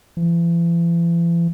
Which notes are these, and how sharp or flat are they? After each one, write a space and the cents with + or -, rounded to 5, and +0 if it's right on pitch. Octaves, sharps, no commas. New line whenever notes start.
E3 +45